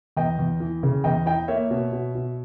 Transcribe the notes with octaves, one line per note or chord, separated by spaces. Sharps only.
E2 D#5 G5
E2
E3
C#3
E2 D#5 G5
E4 D#5 G5
A#3 C#5 E5
B2
B2
B2